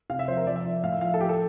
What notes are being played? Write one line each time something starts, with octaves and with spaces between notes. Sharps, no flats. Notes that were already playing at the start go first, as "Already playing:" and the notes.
C3 F5
E5
F3 C5
A#4
F3 D5
E5
F3
A2 F5
E5
F3 F5
A4
F3 G4
A4